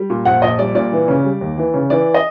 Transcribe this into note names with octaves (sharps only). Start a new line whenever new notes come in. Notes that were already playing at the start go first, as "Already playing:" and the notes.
Already playing: G3
A#2
A#1 F#5
A#1 D#5
G3 D5
A#2 D5
E3
C#3
G3
D#2
E3
C#3
E3 D5
D#5